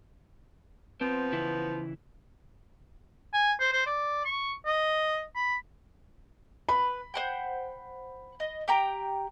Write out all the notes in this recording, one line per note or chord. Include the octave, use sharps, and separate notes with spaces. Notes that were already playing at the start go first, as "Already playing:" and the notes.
F3 B3 C4
C#3 E3 E4
G#5
C5
C5
D5
C#6
D#5
B5
B4 B5
C5 F#5 G5
D#5
G4 G5 A#5